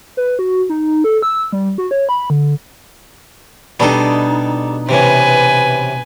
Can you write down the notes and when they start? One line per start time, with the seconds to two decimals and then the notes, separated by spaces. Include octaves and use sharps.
0.17 B4
0.39 F#4
0.69 D#4
1.04 A4
1.22 E6
1.52 G3
1.78 F#4
1.91 C#5
2.09 B5
2.30 D3
3.80 B2 G3 D4 D#4 A4
4.89 C3 E3 C#4 B4 G#5